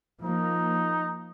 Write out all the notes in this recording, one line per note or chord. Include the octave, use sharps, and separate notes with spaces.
F3 A#3 D#4